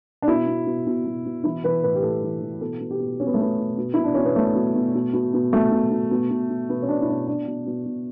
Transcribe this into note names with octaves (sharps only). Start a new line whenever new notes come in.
D4
B2 E4
B2
B2
B2
B2
B2
E3 E4
E3 B4
A2 B4
G4
A2 A4
E3
E3
B2 A4
B2
G4
B2
B2 C#4
B3
A3
B2 B3
B2
B2
B2 E4
D4
B2 C#4
B3
B2 A3
B2
B2
B2
B2
B2
B2 A3
B2
B2
B2
B2
B2
B2 B3
C#4
B2 D4
E4
B2 D4
B2 D4
B2
B2
B2